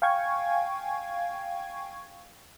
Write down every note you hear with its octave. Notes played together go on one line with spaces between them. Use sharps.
F5 G5 G#5 C#6 G#6